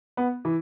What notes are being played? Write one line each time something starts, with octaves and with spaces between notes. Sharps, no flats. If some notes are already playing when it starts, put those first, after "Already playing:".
B3
E3